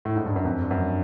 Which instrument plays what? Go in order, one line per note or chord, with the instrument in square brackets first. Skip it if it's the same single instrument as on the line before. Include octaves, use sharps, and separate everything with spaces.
[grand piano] A2
G#2
G2
F#2
F2
G2
F#2